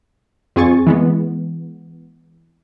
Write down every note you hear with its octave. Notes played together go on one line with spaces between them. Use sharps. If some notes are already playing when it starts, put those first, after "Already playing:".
F2 C4 G#4 G#5 C#6 A6
E3 G#3 B3